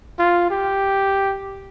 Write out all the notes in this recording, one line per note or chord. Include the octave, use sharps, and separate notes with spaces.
F4
G4